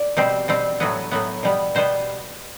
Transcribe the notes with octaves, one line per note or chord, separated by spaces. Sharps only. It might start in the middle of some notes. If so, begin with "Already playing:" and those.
Already playing: D5
B2 G3 C4
B2 G3 C4
A2 F#3 B3
A2 F#3 B3
B2 G3 B3
B2 G3 B3 C5